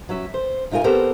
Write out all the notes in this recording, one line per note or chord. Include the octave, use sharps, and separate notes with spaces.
F#3 C#4 E5
C5
C3 D#4 F4 A#4 G#5
B3 C4 G4 A4 A#4 C5